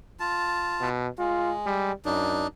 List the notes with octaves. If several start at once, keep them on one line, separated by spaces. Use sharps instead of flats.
F4 A5
B2
G#3 F4
G3
F#2 D4 D#4